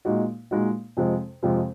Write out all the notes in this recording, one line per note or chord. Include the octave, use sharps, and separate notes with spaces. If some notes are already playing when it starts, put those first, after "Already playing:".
A#2 G#3 D#4 F#4
A#2 G#3 D#4 F#4
F2 C3 F3 G#3
F2 C3 F3 G#3